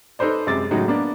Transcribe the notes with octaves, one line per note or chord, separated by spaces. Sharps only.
D#4 A4 B4 C5 D5
F#2 C3 G#3 D6 A6
A2 C#3 F#3 G#3 D#4 F#4
A#3 B3 D4